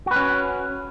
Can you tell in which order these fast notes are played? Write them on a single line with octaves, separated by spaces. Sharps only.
F#4 B4 C#4